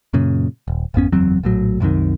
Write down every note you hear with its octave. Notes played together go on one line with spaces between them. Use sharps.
F#2 A#2 C#3
D#1
G#1 F2 B3 C#4
F#1 E2 F#3 C4
A#1 A2 F#3
C2 F#2 C3 D#3